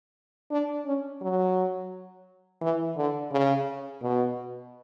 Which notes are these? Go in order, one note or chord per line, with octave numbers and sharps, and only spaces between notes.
D4
C#4
F#3
E3
D3
C#3
B2